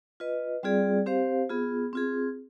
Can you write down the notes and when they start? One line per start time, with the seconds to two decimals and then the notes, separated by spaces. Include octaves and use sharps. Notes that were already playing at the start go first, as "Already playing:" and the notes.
0.20 F4 B4 D#5
0.63 G3 C4 F4 G#4 D5
1.06 C4 G4 C5 F5
1.50 B3 F4 G#4
1.93 C4 F4 G#4